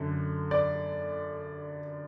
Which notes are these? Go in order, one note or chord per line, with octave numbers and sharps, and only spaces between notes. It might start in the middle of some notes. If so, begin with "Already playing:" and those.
Already playing: F#2 D3
D5